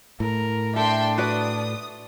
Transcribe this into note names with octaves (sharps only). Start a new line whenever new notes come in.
A2 A#4
D4 A4 E5 G5 C6
F#4 B4 D5 D#6